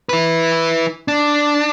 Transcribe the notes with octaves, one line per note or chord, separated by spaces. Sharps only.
E4 B4
D4